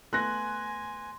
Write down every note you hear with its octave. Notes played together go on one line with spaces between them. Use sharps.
A3 B3 G#5 C6 F#6 A#6